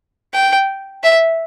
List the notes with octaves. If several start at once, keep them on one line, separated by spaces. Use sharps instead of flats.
G5
E5